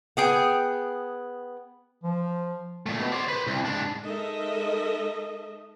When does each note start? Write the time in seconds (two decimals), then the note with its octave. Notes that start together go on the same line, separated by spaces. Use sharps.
0.17 B3 G#4 G5
2.03 F3
2.86 A#2 A3
3.00 B2
3.12 C5 D5
3.29 B4 C5
3.47 C2
3.65 G#2 D4
4.03 G#3 D#4 A4 A#4 D#5 E5